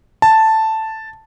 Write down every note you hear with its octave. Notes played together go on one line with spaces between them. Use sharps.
A5